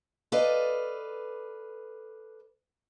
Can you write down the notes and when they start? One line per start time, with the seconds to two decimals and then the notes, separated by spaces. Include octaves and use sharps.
0.32 A4 B4 D5 D#5 F5